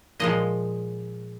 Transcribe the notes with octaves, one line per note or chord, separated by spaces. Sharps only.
A#2 F3 G#3 D#5